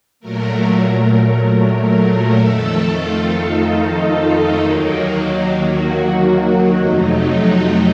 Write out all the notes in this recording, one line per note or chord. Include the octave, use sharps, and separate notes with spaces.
A#2 F#3 A3 A#4
F2 D#3 A3 A4
F4
D#4
D#2 D#3 F#3 A#3
F#4
F#4
F2 C3 F#3 A3 D#4